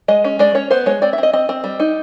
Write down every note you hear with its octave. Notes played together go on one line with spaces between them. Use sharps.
G#3 D#5
C#4
G#3 D5
C#4 C#5
B3 C5
G#3 C#5
C4 D5
E5
C4 D#5
C4 D#5
C4
G3
D#4